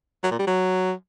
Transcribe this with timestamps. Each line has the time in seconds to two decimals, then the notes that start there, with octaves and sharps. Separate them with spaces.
0.23 F#3
0.31 A#2
0.39 G3
0.47 F#3